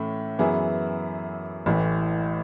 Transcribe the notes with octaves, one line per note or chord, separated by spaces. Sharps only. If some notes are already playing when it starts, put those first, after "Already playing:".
Already playing: A2 E3 A3 C#4
F#2 E3 B3 E4 G#4
A1 A2 E3